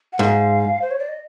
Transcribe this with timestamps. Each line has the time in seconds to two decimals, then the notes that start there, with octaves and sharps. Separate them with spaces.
0.13 F#5
0.19 G#2 F5
0.82 C5
0.91 C#5
0.99 D5
1.09 D#5